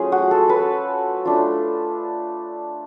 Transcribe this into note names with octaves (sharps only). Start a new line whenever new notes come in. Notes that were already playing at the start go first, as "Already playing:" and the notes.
Already playing: F#3 A3 C#4 F4 G#4
F#4
A4
B4
A3 D4 F4